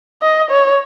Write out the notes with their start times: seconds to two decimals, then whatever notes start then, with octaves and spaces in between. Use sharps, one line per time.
0.22 D#5
0.51 C#5